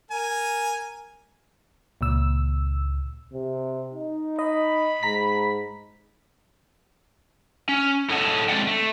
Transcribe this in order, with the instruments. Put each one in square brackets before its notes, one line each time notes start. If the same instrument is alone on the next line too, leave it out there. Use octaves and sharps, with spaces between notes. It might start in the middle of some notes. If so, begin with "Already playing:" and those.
[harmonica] A#4 G#5
[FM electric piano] C#2 A#2 E6
[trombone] C3
D#4
[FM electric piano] D#5 [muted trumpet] B5
[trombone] G#2 [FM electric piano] A#5 B6
[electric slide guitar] C#4
E4 A4 C#5 D#5 F#5 A5
G#3 C4 D4 D5 F#5 G5
A3